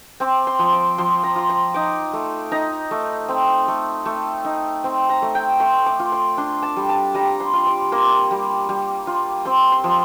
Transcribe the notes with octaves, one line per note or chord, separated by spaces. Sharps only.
C4 D6
C6
F3
D6
F3 C6
A#5
F4
C6
D#4 D6
A3
D#4 A#5
A3
C4
A3
A3
D#4
C4
A#5
A3
G5
A3 C6
D6
F4
C6
D4 C6
A5
G3
A5
G3 A#5
C6
F4
D6
A#3 C6
G3
G3
F4
C4 C6
C6
F3